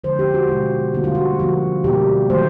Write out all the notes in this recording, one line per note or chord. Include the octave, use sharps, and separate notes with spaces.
D3 F3 G#3 C5
G4
F#4
B2 G#3 F4
D3 G3 A#3 F#4
F4
F#4
D3 F3 A#3 F#4
B2 G3 A#3 G4
D#3 F#3 A3 C5